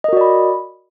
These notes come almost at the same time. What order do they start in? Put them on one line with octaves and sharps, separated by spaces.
D#5 A#4 F#4 D5 B5